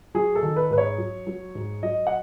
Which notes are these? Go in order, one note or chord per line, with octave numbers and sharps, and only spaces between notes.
F#3 G#4
A4
D#3
B4
G#2 B4
C#5
F#3
F#3
G#2
F#3 D#5
F#5